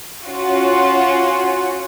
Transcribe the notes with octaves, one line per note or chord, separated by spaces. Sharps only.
C#4 F4 F#4